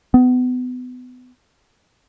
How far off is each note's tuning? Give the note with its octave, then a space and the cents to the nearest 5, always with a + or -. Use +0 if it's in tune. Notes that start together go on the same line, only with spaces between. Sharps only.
B3 +30